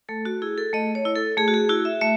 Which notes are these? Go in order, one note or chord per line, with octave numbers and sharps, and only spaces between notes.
A3 A4
F#4
E4 G#4
A4
A3 D#5
C#5
E4
A4
A3 G#4
F#4
G#4
E4 F#4
E5
A3 E5